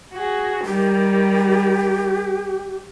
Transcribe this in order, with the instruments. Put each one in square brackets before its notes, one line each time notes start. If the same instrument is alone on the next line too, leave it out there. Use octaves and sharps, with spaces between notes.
[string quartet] F#4 G#4
[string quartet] D#3 G3 [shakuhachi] G4